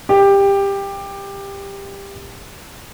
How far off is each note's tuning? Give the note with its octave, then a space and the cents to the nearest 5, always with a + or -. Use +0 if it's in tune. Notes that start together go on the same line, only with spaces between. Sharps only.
G4 +15